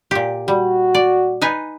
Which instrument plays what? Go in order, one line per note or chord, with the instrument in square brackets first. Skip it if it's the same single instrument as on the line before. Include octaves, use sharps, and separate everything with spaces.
[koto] A#2 G4
[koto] G3 [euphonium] F#4
[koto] D5
D#4 B4 G#5